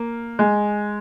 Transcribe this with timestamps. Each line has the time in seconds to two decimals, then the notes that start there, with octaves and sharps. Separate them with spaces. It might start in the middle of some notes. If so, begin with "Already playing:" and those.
Already playing: A#3
0.39 G#3